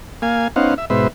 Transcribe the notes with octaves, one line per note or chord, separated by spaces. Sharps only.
A#3 F5 G#5
B3 C#4 D#4 C5 F5 F#5
E5
G#2 B2 B4 C5 E5